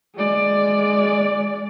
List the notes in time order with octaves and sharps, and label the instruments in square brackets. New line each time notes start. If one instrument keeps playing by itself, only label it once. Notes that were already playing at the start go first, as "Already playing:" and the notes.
[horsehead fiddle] G#3 D5